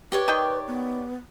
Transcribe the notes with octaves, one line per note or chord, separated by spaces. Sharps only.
G4 B4 C#5 D5
D#3 D#5 G5
B3